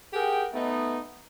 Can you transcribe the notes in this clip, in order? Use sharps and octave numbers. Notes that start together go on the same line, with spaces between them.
G4 G#4 A#4 F#5 G5
A3 B3 D#4